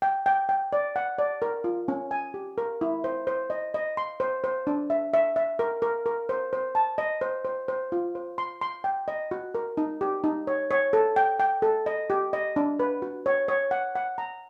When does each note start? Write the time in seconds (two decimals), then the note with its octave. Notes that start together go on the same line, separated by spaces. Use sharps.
0.02 G5
0.26 G5
0.49 G5
0.73 D5
0.96 F#5
1.18 D5
1.42 A#4
1.64 F4
1.88 C#4
2.11 G#5
2.34 G4
2.58 A#4
2.81 E4
3.04 C5
3.27 C5
3.50 D#5
3.74 D#5
3.97 C6
4.20 C5
4.44 C5
4.67 D4
4.90 E5
5.14 E5
5.36 E5
5.59 A#4
5.82 A#4
6.06 A#4
6.29 C5
6.53 C5
6.75 A5
6.98 D#5
7.21 C5
7.45 C5
7.68 C5
7.92 F4
8.15 C5
8.38 C6
8.61 C6
8.84 G5
9.08 D#5
9.31 F#4
9.55 A#4
9.77 D#4
10.01 G4
10.24 D#4
10.47 C#5
10.71 C#5
10.93 A4
11.16 G5
11.40 G5
11.62 A4
11.86 D#5
12.10 G4
12.33 D#5
12.56 D4
12.80 B4
13.02 F#4
13.26 C#5
13.48 C#5
13.71 F#5
13.96 F#5
14.18 A#5